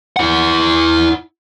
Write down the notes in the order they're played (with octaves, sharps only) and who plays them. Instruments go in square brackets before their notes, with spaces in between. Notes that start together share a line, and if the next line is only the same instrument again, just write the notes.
[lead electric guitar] E4 F#5